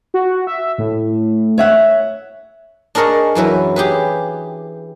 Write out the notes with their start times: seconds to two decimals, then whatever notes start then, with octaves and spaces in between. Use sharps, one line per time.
0.14 F#4
0.47 E5
0.78 A2
1.58 C#5 E5 F#5
2.95 D4 G#4 A#4 C#5 D#5
3.35 F#2 E3 F#3 B4
3.76 G4 G#4 B4